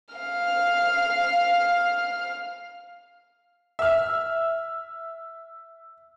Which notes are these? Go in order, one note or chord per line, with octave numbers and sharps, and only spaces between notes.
F5 F6
E5 F6